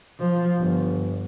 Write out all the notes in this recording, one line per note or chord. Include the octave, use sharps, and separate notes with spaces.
F3
G1